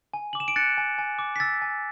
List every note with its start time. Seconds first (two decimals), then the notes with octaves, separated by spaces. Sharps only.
0.14 G#5
0.33 D6 F#7
0.40 E7
0.48 D7
0.56 F#6 A6 C#7
0.78 G#5
0.98 G#5
1.19 D6
1.36 B6
1.40 E6 A6
1.62 G#5